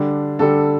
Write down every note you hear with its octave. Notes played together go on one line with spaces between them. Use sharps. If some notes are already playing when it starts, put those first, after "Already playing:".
Already playing: D3 G3 D4
D3 G3 D4 A4